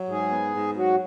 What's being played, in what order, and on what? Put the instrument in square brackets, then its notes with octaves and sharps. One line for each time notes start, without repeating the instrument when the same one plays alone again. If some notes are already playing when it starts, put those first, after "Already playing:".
Already playing: [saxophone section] F#3
[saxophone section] G#2 [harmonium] G#4
[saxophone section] B3
G#2
[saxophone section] F#3 [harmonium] F#4